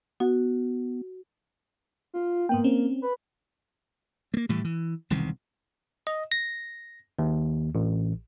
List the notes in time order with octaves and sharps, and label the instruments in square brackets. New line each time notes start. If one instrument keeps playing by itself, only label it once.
[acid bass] B3 [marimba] F#4
[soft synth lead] F4
[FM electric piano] G#2 B3 G5 [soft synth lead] A#3
[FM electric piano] C4 C#4
[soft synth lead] B4
[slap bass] A3 A#3
A2 E3 G3
E3
E1 C2 C3 D#3
[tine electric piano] D#5
A#6
D#2
A1